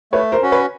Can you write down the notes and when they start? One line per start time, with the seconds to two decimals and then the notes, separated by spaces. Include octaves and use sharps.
0.13 A3 B4 C#5
0.32 A#4 C5
0.42 C#4 F#4
0.52 B4 C#5